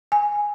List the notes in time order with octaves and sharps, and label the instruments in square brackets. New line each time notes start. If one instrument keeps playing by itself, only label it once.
[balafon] G#5